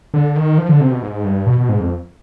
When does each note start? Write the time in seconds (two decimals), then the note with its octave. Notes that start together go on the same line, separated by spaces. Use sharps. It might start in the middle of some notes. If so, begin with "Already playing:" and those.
0.14 D3
0.36 D#3
0.58 F3
0.69 D3
0.80 C3
0.91 B2
1.02 G#2
1.24 G2
1.46 B2
1.58 B2
1.69 G#2
1.80 F2